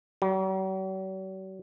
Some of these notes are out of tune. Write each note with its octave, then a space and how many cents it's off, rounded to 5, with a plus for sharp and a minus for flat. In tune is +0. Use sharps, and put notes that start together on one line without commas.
F#3 +45